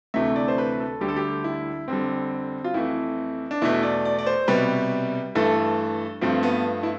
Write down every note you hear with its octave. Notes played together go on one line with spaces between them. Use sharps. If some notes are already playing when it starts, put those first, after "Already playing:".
D2 C3 E3 A3 E5
D5
C5
B4
A4
D2 D3 G3 G4
A4
G4
E4
F2 D3 G3 C4
F4
F2 E3 A3 E4
D4
E2 B2 A3 E4
D5
D5
D5
C5
C2 B2 G3 B4
G2 E3 A3 A4
G2 F3 A3 C4
B3
E4